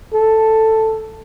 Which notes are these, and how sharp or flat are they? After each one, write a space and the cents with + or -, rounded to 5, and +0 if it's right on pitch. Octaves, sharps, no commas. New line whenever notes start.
A4 +5